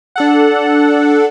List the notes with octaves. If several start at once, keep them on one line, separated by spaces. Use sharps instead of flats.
D4 A4 F#5